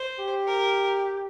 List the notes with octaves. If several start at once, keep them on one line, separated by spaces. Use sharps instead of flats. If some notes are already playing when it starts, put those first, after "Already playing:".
Already playing: C5
G4
A#4